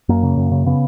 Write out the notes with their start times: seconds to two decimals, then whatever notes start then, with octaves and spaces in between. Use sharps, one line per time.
0.09 F#2 A#3
0.23 C#3
0.37 F#2
0.52 C#3
0.66 C#3 B3